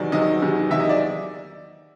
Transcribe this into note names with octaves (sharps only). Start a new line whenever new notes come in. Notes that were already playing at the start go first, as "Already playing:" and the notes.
Already playing: E2 C3 D#3 F#3 D5
E2 C3 D#3 F#3 D#5
E2 C3 D#3 F#3
E2 C3 D#3 F#3 E5
D#5
D5